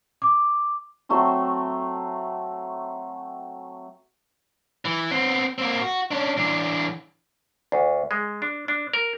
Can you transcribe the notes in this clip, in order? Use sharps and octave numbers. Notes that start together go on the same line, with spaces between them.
D6
F#3 A3 C4 E6
E3
B3 C4
A#3 C4
F#4
C#4 D4
E3 D4
D2
G#3
D4
D4
A#4